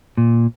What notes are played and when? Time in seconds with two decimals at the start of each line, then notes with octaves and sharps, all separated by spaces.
0.17 A#2